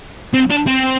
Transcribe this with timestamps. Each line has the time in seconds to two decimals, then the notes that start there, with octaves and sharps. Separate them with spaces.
0.34 C4
0.51 D4
0.67 C4